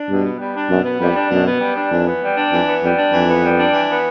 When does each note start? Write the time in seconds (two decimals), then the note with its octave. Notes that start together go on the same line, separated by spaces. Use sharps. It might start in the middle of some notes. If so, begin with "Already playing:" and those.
Already playing: D4
0.09 G2 B2
0.25 B3
0.40 G3
0.55 D4
0.70 F#2 B2
0.85 B3
1.00 F2 G3
1.16 D4
1.30 F#2 B2
1.46 B3
1.61 G3
1.76 D4
1.91 F2 E3
2.07 B3
2.22 G3
2.37 D4
2.52 F2 E3
2.68 B3
2.83 F2 G3
2.97 D4
3.13 F2 E3
3.27 B3
3.44 G3
3.59 D4
3.73 E3
3.89 B3